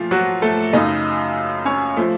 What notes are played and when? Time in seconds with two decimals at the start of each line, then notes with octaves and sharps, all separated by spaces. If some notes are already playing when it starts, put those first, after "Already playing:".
Already playing: A#2 F3 A3 F4
0.11 F#3 F#4
0.42 A3 A4
0.73 F#2 C#3 A3 D#4 D#5
1.65 C#4 C#5
1.97 F3 A3